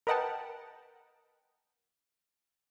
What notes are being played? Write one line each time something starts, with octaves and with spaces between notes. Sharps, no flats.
A#4 B4 D#5 F#5 G5 A5